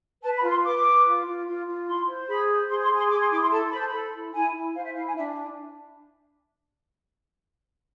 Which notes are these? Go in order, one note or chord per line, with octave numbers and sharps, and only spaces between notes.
B4 A5
B5
F4
C6
B4 D6
B4
F4
F4
F4
F4
E4 C6
C5
G#4 B5
C5
G#4 C6
C6
G#4
C6
G#4 D6
C6
E4 D6
C6
A4 A5
C5 B5
A5
B5
A4
E4
E4 G#5
E4
C5 F5
E5
E4 F5
G#5
D4 E5